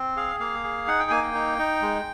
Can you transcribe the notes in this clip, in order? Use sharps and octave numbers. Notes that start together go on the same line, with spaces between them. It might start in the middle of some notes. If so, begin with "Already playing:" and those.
Already playing: C4
G#4 F5
A#3 F5
G#4
D#4 F#5
G5
A#3 G#5
G5
D#4
D#4
G#3